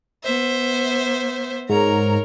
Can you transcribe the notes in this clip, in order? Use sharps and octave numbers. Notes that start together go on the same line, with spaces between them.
B3 C5 E5
G#2 A#4 C#5 A#5